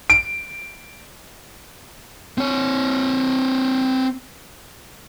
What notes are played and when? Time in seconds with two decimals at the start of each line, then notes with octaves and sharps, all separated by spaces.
0.10 D7
2.38 C4 C#5